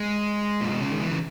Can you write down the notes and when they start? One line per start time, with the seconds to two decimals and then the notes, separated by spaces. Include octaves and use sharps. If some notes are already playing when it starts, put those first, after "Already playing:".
Already playing: G#3
0.61 A#2
0.71 B2
0.81 C#3
0.90 D#3
1.00 E3
1.11 C#3